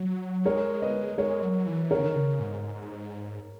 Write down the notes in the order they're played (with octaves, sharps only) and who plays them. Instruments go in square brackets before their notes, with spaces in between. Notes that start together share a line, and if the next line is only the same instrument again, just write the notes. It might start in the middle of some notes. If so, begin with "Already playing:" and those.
Already playing: [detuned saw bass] F#3
[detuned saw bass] G#3 [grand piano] A#4 C#5
[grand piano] B4 D#5
[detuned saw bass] G#3 [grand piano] A#4 C#5
[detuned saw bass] F#3
E3
[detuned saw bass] D#3 [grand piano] A#4 C#5
[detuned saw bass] C#3
D#3
C#3
G#2